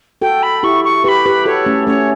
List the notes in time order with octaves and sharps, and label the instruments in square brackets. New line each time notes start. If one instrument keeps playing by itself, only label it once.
[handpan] F#4 A4 [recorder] G5
[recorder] B5
[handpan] E4 G4 [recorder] C#6
[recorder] C#6
[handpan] G4 B4 [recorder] B5 C#6
[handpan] G4 B4
[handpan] F#4 A4 [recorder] C#5
[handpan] A3 C#4
[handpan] A3 C#4 [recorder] C#5